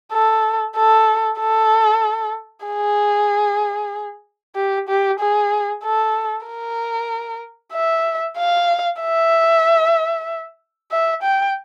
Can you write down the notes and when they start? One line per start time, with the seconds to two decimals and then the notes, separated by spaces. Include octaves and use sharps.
0.13 A4
0.76 A4
1.39 A4
2.66 G#4
4.56 G4
4.89 G4
5.20 G#4
5.84 A4
6.47 A#4
7.74 E5
8.38 F5
9.01 E5
10.91 E5
11.23 G5